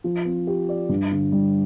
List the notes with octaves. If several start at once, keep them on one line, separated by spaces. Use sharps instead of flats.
F3
C4
G4
D5
G2
D3
G3